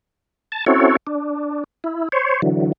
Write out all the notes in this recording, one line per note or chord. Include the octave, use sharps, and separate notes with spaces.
A5
C4 C#4 E4 F#4 A4 C#5
D4
E4
C5 C#5
D3 E3 F#3